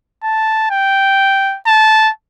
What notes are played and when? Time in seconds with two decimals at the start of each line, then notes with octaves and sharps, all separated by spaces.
0.24 A5
0.71 G5
1.67 A5